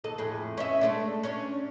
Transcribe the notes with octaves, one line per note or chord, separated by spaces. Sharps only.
D#2 A4 D#5
F2 A2 G#4
C#4 D#5 E5
G#3 A3 D4
C#4 D4 C#5